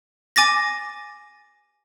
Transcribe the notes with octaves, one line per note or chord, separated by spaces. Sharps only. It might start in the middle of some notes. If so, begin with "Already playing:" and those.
G#5 D6 A6 A#6